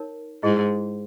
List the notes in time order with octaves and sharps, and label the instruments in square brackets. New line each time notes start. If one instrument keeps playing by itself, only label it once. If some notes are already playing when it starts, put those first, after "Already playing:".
Already playing: [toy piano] D#4 A#4 C#5
[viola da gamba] G#2 [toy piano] E4 G#4 D#5